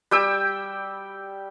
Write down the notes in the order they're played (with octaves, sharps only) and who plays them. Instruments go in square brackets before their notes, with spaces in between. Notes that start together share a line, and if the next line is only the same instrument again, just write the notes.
[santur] G3 G5 E6